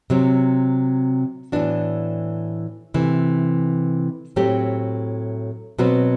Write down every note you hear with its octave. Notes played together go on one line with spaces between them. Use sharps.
C3 F#3 C4
A2 E3 B3 D4 F#4
C3 E3 A3
A2 F#3 A3 C4 G4
B2 F#3 C4 F#4 B4